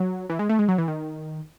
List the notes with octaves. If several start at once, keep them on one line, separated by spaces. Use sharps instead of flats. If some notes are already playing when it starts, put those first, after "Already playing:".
Already playing: F#3
E3
G#3
A3
G#3
F#3
E3
D#3